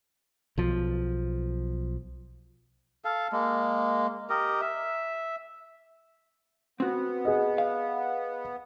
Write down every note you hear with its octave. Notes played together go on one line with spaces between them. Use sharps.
B1 F3
A4 F5
G#3 A#3
G4 A#4 D#5
E5
B3 C4 F#4
G#4 D#5
F5